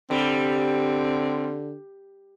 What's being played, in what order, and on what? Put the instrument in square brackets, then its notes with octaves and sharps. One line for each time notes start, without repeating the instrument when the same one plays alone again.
[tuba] D3 [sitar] G3 [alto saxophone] C4